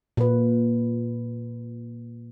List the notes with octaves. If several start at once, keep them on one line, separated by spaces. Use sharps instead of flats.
A#2 B4